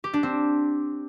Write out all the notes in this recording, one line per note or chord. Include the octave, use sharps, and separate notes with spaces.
G4
D4
C4